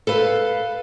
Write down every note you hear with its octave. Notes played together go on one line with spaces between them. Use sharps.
A4 B4 F5